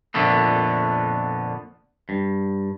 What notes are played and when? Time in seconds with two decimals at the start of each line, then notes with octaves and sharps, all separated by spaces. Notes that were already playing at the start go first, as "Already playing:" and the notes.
0.14 F2 A#2 D3 A3 B3
2.09 G2